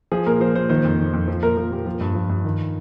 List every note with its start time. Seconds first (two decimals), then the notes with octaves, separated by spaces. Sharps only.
0.12 F3 G#4
0.26 A#2 A#4
0.40 F3 C5
0.55 A#2 C5
0.70 D#3 C5
0.84 F2
0.99 D#3
1.13 F2
1.28 F3
1.43 A#2 A#4
1.57 F3 A#4
1.72 A#2 G4
1.86 F3 F4
2.01 G2
2.15 F3
2.29 G2
2.44 D#3